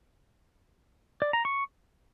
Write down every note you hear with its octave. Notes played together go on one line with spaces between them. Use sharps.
D5
A#5
C#6